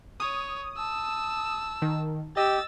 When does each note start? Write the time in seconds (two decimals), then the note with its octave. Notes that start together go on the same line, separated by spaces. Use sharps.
0.20 C#5 D#6
0.77 A5 E6
1.82 D#3
2.37 G4 D#5 E6 A6